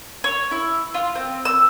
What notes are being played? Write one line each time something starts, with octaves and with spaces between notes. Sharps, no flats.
C#5
E4
F4
C4
E6